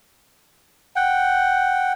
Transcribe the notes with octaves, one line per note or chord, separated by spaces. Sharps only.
F#5 G5